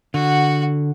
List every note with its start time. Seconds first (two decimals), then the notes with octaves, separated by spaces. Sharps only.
0.14 D3 F#4 F#5